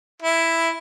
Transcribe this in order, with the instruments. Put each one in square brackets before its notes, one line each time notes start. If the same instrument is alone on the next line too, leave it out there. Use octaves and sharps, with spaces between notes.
[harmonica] E4